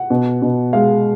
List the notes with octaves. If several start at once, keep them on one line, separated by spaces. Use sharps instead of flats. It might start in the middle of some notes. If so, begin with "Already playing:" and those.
Already playing: F#5
B2
B2
G#3 F5